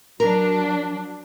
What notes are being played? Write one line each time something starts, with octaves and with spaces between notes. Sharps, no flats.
F#3 D4 A#4